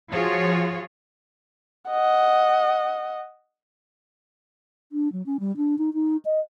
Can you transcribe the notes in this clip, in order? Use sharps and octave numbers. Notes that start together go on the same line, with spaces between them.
F3 F4 F#4 G#4 C#5
D#5 F#5
D4
F#3
C#4
G3
D4
D#4
D#4
D#5